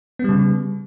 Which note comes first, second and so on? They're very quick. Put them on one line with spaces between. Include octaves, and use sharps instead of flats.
B3 G3 C#3